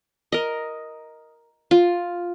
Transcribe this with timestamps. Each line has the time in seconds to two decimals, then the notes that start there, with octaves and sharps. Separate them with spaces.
0.32 A#4 D#5
1.71 F4